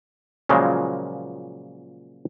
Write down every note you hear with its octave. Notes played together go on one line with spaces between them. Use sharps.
A#2 C#3 F3 F#3 G#3 A#3